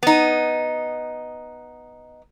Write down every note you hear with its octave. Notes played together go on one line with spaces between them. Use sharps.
B3 D#4